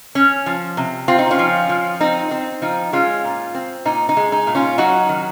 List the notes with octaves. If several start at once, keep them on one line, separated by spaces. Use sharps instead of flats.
C#4
F3
C3
C4 F4
D#4
C#4 F4
F3
F3
C4 D#4
C4
F3 D#4
G#3 C#4 F4
A#2
C4
A#2 D#4
D#4
G#3
D#4
A#2
C#4 F4
F#3 D#4 F#4
D#3